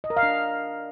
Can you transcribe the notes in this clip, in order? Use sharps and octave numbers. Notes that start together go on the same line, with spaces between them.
D#5
A#4
F5
D4